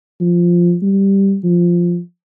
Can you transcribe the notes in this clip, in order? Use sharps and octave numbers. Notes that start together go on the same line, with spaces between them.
F3
G3
F3